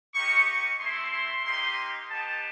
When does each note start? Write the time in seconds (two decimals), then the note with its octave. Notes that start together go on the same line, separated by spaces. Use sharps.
0.14 A#3 D#4 G4 C#6
0.47 C#6
0.79 A3 C4 E4 C6
1.13 C6
1.44 A#3 D#4 G4 C6
2.09 B3 D#4 G4 A5